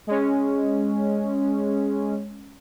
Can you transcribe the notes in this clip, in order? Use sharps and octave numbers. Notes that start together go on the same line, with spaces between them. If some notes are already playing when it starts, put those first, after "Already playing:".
G#3 C#4